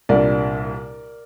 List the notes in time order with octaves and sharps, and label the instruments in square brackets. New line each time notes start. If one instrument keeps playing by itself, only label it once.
[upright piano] C2 A#2 G3 D4 A#4 D5